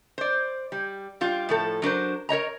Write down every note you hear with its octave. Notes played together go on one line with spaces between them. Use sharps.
C5 D5
G3
G3 F4
A2 F3 A4
F#3 D4 A#4 C5
A#4 C#5 D#5 A#5